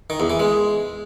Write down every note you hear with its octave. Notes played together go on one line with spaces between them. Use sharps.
D#3
E2
E3
G#3